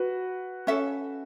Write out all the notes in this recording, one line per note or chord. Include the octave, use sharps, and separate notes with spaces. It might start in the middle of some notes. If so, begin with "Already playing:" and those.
Already playing: F#4 B4
C#4 A4 E5